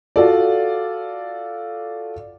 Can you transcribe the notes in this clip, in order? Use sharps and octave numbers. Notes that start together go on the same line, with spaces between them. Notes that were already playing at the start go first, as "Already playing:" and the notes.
F4 F#4 A4 D5